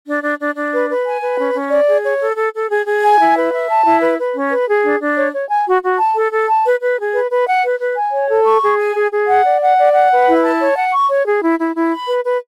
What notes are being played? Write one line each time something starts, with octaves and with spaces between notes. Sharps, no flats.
D4
D4
D4
D4
B4
B4
G#5
B4
C#4
C#4
D5
G#4
C#5
A4
A4
A4
G#4
G#4
G#5
E4
B4
E5
A5
E4
B4
B4
C#4
B4
G#4
D4
D4
C#5
C#5
G#5
F#4
F#4
A5
A4
A4
A5
B4
B4
G#4
B4
B4
F#5
B4
B4
G#5
C#5
A4
C#6
G#4
G#5
G#4
G#4
F#5
D5
F#5
D5
F#5
B4
E4
A5
C#5
F#5
C#6
C#5
G#4
E4
E4
E4
B5
B4
B4